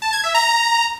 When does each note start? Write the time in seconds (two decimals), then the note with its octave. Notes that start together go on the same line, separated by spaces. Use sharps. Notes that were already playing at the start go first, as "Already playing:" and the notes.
0.02 A5
0.13 G#6
0.24 E5
0.34 A#5